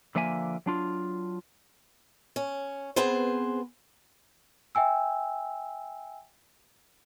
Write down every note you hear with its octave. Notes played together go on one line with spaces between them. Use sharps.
D3 F3 A#3 E5 G#5
F#3 D4 F4
C#4
B3 C4 G#4 B4 C5
E5 G5 G#5 E6